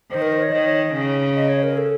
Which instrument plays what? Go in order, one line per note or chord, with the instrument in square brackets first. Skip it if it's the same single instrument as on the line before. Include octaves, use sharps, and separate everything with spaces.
[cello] D#3 [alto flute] C5
[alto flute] A#4
C5
C#5
[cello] D#3 [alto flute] D#5
[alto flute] C#5
[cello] C#3
[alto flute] D#5
C#5
A#4
A4